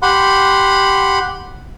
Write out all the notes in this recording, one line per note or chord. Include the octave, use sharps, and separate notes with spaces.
G4 F#5 B5 C6